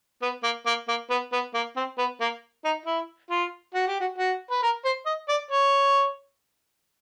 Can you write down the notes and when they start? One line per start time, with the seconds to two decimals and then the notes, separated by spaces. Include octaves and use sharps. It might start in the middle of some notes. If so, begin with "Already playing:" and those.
0.22 B3
0.44 A#3
0.66 A#3
0.88 A#3
1.10 B3
1.33 B3
1.55 A#3
1.77 C4
1.98 B3
2.21 A#3
2.65 D#4
2.86 E4
3.31 F4
3.75 F#4
3.88 G4
4.01 F#4
4.18 F#4
4.51 B4
4.63 A#4
4.85 C5
5.06 D#5
5.29 D5
5.51 C#5